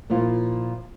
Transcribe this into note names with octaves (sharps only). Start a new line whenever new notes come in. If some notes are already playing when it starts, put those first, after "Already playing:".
A#2 F3 E4 F4